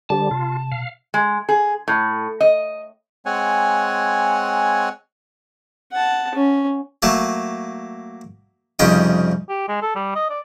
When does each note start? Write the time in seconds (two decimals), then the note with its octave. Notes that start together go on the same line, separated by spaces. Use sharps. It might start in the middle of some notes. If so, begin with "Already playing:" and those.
0.10 D3 G3 D4 G4 C5 A5
0.31 C3 F4
0.72 B2 F5
1.14 G#3
1.49 G#4
1.88 A2
2.41 D#5
3.26 G#3 C4 C#5 F#5 G#5
5.93 F#5 A5
6.35 C#4
7.02 F#3 A3 A#3 A4
8.79 C2 F2 C#3 D#4 G5
9.49 G4
9.68 G#3
9.82 A4
9.95 G3
10.15 D#5
10.30 D5